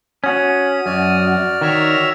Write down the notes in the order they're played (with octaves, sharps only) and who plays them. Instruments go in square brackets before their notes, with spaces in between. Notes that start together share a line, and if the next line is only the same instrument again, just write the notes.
[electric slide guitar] C#4 F#4 [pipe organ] D#6
[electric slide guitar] F#2 [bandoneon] F#4 D5 F6
[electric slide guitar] D#3 [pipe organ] C#5 E5 A#5